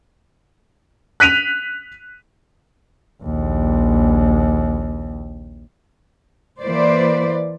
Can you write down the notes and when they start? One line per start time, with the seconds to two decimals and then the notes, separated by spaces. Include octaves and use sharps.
1.20 F#6 B6 D#7 F7
3.22 A#1 D#2
6.60 E3 A#3 B4 C5 D5